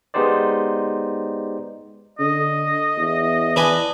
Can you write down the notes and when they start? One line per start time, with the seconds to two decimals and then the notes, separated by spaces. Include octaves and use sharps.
0.14 G#3 B3 D#4 G4 C5 D5
2.19 D3 D#5
2.97 E2
3.56 D4 B4 G#5